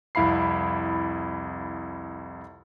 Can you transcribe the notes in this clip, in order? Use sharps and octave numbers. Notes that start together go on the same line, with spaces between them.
C2 F2 E4 F5 B5 C7